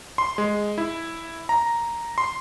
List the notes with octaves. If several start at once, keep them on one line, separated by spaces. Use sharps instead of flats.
C6
G#3
E4
A#5
C6